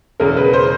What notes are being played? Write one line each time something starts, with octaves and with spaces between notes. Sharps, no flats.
E1 E2 C#3 A#4
B4
C5